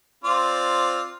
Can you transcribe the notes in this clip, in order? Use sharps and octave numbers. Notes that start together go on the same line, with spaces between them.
C4 F4 D5